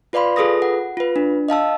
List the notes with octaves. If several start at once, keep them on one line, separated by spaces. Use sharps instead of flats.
F4 B4 D5 F5 B5 C6
F4 G#4 A4 B4 D#6 A#6
F#5
F4 B4
D4
D#5 F5 A5 E6